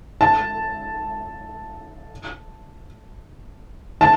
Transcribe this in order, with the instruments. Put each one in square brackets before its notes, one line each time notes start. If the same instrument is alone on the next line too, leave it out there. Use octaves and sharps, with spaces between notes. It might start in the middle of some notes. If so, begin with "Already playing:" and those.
[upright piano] A5
A5